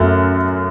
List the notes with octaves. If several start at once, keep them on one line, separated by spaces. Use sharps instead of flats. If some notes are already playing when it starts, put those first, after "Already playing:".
Already playing: F#2 F#3 A3 F#4